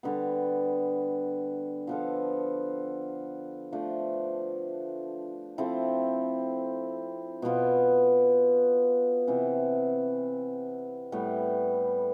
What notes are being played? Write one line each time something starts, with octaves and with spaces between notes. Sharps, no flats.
D3 G3 B3
F3 B3 F4 A4
F3 A3 D4
F3 C4 E4 A4
B2 B3 F4
C3 E3 B3
A2 G3 B3